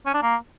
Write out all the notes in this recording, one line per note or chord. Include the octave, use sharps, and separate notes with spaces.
C#4
D4
A#3